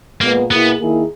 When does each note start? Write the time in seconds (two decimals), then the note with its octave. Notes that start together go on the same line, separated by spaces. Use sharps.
0.21 A#2 G#3 A#3 B3
0.50 B2 A#3 B3 E4 G#4
0.79 D#3 A#3 E4 G#4